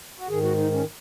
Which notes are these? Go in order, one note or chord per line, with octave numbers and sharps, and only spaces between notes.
F#4
G#2 D#3 G#4
F#4
D#4
C#4